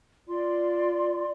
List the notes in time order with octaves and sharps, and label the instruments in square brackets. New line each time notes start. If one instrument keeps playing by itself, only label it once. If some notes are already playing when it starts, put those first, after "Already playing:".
[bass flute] F4 [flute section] D5 C6